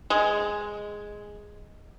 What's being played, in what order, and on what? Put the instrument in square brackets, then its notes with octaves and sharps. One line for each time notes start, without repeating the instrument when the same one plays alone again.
[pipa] G#3